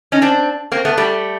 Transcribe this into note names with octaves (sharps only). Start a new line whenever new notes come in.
C#4 D#4
C4 D4
A#3 C4
A3 B3
G3 A3